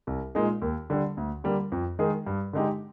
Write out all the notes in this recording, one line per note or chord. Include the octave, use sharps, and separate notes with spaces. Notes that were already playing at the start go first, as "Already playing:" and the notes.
C2
A#2 G#3 D#4 G#4
D#2
D3 G3 D4
D2
D3 G3 A#3
F2
D#3 G#3 D#4 G#4
G2
D3 G#3 D#4 G4